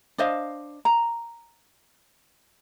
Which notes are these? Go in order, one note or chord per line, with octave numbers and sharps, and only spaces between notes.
D4 C5 D#5 F5
A#5